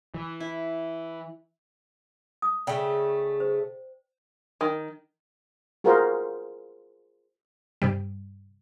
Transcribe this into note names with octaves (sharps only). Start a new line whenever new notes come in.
E3
E4
D#6
C#3 A3 D5 G5
C5
D#3
F4 F#4 G#4 A#4 C5 F5
G2 C3 G3